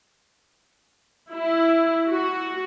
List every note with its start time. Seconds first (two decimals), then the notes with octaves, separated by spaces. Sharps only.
1.32 E4
2.08 F#4